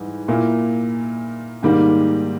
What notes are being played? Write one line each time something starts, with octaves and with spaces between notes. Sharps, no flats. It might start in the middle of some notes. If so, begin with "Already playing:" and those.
Already playing: G#2 E3 G3
A#2 A#3 E4
G#2 D#3 G3 A#3